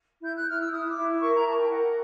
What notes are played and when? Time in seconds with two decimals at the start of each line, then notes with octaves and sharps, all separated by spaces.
0.23 E4 G6
0.35 F#6
0.47 E4 F6
0.60 E6
0.71 E4 D#6
0.88 D6
0.96 E4
1.21 A#4 C#6
1.33 A#5
1.45 A#4 A5
1.57 G5
1.69 A#4 F#5